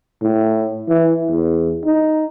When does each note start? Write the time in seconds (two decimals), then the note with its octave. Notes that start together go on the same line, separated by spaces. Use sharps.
0.22 A2
0.88 E3
1.30 E2
1.85 D#4